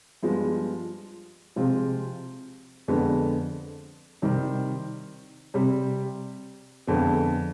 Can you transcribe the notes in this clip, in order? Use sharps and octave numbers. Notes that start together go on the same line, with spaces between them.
G2 F3 G#3 B3
C3 F3 G#3 C4 F4
F2 D3 G#3 B3
C3 D#3 G3 C4
C3 G3 C4
F2 D3 G#3 B3